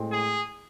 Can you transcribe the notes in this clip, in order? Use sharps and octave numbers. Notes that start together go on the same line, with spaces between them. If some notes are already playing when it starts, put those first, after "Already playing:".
Already playing: A2 G#3 C4
G#4